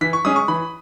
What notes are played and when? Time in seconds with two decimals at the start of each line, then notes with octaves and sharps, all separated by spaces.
0.01 E3 B6
0.13 C#6
0.25 G#3 C#4 D#6
0.36 C#6
0.48 E3 B5